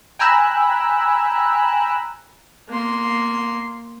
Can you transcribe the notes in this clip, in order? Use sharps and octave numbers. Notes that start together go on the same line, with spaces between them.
G5 G#5 A#5 B5 E6 F#6
A#3 C6